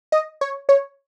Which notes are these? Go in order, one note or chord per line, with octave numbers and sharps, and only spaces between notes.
D#5
C#5
C#5